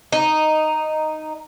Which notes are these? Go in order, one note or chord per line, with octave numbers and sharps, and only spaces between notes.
D#4